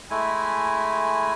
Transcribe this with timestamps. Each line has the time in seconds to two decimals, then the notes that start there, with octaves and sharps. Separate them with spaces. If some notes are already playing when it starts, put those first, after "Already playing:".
0.10 G#3 A3 E4 G#5